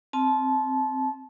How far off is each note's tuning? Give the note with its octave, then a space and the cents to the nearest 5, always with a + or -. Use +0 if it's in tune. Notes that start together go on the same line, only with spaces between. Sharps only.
C4 +0 A5 -25